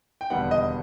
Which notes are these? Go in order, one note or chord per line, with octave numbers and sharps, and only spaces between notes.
G5
E1 D#2 D3 G3 B3 F#5
D#5